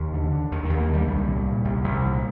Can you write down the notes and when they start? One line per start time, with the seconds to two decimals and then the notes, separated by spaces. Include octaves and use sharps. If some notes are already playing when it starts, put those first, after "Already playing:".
Already playing: D#2 D#3
0.14 D3
0.32 D3
0.52 D#2 D#3
0.65 D#2 D#3
0.80 A#3
0.89 D3 G3
1.08 C2 G3
1.27 A#2
1.45 A#2
1.65 C2
1.84 C2
2.02 A#2